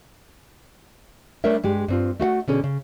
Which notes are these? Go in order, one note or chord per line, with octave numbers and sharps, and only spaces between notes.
G3 A3 D4 A#4 C#5 E5
G2 G#3 G4
G2 C4 F4
A3 F#4 F5 F#5
B2 D3 C#4 G#4
C#3